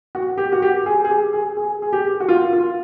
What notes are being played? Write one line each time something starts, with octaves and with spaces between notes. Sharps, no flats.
F#4
G4
F#4
G4
G#4
G#4
G4
G#4
G#4
G#4
G4
F#4
F4
F4